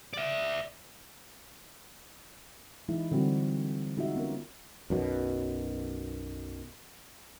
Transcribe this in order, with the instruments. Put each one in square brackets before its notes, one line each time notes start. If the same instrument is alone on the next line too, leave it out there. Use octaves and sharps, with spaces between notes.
[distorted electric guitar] D5 E5
[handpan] E3 G#3 D#4 E4
D3 G3 C4 F#4
G#3 D#4 F4 F#4 E5
B3 C#4 A#4
[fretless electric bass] B1 F#2 B2